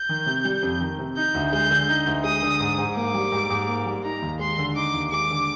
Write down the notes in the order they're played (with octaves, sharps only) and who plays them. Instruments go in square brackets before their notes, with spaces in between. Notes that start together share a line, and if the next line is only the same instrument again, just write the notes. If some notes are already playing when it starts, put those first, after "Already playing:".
Already playing: [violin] G6
[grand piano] D#3
C3
G3
F2
D#3
C3
[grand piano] D#4 [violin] G6
[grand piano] D2
[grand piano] G#3 [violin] G6
[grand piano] D3
D#4
D2
[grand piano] G#3 [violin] D#6
[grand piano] D3
G#2
G#2
[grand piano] A#3 [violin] D6
[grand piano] G3
G#2
G#2
A#3
G3
[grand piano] D#4 [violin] A#5
[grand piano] D#2
[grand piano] G#3 [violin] C6
[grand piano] D3
[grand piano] D#4 [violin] D6
[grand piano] D#2
[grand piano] G#3 [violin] D6
[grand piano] D3